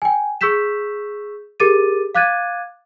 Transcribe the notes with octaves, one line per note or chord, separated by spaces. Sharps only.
G5 G#5
G#4 C#6 E6 G6 B6 E7
G4 G#4 A#4 D6 A6 D#7
F5 D6 F#6 G#6 A6 D#7